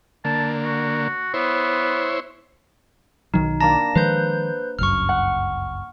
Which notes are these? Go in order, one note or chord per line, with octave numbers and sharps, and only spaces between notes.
D3 A#3 A5
F#4
B3 E4 C5 C#5
B1 D#3 F#3 D#4
A#3 D4 A5 A#5 A#6
D#3 F3 G#3 B4 C5 G6
G1 C#2 F#2 C#6 F6
F#5